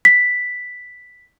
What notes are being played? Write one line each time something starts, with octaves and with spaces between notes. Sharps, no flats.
B6